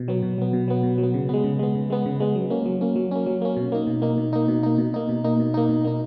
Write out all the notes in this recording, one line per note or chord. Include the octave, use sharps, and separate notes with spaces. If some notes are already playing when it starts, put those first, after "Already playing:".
Already playing: B2
F#3 B3
B2
F#3 B3
B2
F#3 B3
B2
F#3
B3
C#3
G#3 B3
C#3
G#3 B3
C#3
G#3 B3
C#3
G#3 B3
F#3
A#3 C#4
F#3
A#3 C#4
F#3
A#3 C#4
F#3
A#3 C#4
B2
A#3 D#4
B2
A#3 D#4
B2
A#3 D#4
B2
A#3 D#4
B2
A#3 D#4
B2
A#3 D#4
B2
A#3 D#4
B2
A#3 D#4